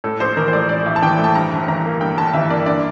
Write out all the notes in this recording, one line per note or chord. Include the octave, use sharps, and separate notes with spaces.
A2 A4
A#1 C5
E3 A#4
C5
A3 D5
A2 D5
A#1 E5
A5
E3 G5
A3
A5
G2 A#5
G1
E3 A#5
A#3
G2 G5
G1 A5
E3 E5
A#3 D5
D3 D5